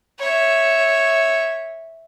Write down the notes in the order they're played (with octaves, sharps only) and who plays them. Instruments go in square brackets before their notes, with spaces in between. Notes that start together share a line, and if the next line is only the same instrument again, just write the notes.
[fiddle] C#5 E5